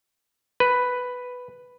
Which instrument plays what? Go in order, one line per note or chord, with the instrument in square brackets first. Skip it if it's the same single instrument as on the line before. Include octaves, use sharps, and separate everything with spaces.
[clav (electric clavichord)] B4